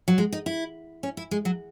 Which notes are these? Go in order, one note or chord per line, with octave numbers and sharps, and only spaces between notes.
F#3
G#3
D#4
E4
C#4
E4
G#3
F#3